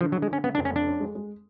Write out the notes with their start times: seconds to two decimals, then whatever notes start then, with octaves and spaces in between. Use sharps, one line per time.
0.01 D3 F3
0.12 F#3
0.16 D3
0.22 G#3
0.30 D3 C#4
0.44 C#3 B3
0.55 D4
0.58 F1
0.65 C#4
0.72 F2 D4
0.87 C#4
1.00 G#3
1.15 G#3